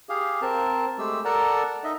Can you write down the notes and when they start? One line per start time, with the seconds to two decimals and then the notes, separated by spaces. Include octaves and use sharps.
0.09 G4 G#4 F5
0.42 C4 A#4 A5
0.98 G#3 A3 G4 E6
1.25 A4 A#4 D5 F#5 A5 A#5
1.84 D#4 D#5 E5